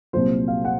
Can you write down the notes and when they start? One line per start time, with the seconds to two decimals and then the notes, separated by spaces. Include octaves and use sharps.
0.13 C2 A#2 F#3 C5
0.48 F5
0.65 F#5